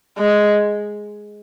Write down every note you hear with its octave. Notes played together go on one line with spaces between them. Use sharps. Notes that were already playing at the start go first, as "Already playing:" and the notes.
G#3